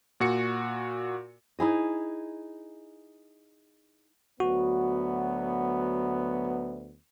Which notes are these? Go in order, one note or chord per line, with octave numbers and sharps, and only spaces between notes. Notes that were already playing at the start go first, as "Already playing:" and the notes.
A#2 F#4 C#7
D#4 E4 G#4 D#5
D2 F#3 B3 F#4